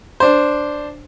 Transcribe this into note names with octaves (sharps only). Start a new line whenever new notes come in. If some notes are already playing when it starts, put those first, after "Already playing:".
D4 C5